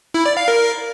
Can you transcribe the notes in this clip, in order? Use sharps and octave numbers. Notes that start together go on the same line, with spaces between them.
E4
D5
F5
A#4